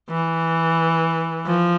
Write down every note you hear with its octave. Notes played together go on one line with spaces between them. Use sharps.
E3
F3